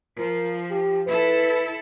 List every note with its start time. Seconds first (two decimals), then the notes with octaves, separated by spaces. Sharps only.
0.18 F3 A#4
0.71 G4
1.08 E4 A4 B4